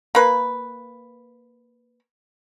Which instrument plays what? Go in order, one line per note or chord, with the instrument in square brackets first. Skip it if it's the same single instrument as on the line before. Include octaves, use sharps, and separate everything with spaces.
[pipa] A#3 B4